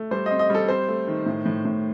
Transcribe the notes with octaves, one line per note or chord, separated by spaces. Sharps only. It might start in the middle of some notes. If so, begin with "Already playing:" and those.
Already playing: A3
G3 C5
D#5
C4
D#5
G3 A4
C4 C5
A3
D#3
A2
A2
A2